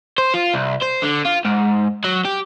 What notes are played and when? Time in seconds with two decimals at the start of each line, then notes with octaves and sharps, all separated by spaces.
0.18 C5
0.34 F4
0.53 C2
0.82 C5
1.02 D3
1.25 F4
1.45 G#2
2.04 F#3
2.25 G4